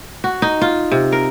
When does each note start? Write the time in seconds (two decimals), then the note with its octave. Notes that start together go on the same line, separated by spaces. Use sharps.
0.24 F#4
0.42 D#4
0.61 F4
0.92 C3
1.12 A#4